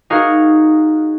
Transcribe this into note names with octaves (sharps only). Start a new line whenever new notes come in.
D#4 F#4 G#4 A#4 F5